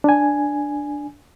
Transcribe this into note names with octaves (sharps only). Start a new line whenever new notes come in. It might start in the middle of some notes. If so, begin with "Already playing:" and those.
D4 G#5